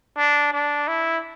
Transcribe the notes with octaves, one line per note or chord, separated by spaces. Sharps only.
D4
D4
E4